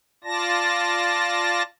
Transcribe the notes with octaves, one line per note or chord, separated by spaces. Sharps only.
F4 D5 A5 A#6